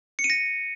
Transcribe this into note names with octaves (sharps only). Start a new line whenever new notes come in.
C#7
D#7
A#6